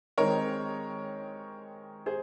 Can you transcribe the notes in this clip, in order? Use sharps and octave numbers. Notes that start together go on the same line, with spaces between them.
D#3 G#3 C4 A#4 C#5
G#4 C5